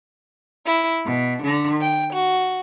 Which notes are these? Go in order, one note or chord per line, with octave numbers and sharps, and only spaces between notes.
E4
B2
D3
G5
F#4